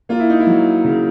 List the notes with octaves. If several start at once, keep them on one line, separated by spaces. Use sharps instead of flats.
A#3 F4
E4
D#4
E4
F#3
C#3